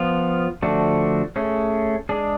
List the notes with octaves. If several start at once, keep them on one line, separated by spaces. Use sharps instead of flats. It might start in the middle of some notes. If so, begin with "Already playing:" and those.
Already playing: F3 B3 F4
D3 F3 A3 D4 F#4
A3 C#4 G#4
G#3 D4 G#4